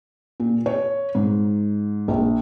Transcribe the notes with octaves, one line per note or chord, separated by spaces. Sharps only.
A#2
C#5
G#2
A#1